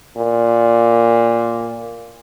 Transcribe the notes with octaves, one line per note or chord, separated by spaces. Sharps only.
A#2